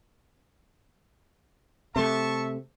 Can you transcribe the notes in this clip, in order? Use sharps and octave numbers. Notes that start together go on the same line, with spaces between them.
C3 A3 E5 A5 C#6